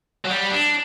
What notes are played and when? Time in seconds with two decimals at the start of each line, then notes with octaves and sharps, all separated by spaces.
0.25 F#3
0.30 G3
0.51 D4